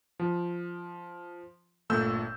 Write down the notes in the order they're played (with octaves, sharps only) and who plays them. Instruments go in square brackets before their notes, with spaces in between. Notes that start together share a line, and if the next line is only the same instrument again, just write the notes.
[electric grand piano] F3
G1 A#2 A3 E6 G6